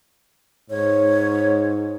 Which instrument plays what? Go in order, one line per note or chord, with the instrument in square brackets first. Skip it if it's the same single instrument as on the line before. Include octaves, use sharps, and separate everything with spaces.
[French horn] G#2 [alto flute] C#5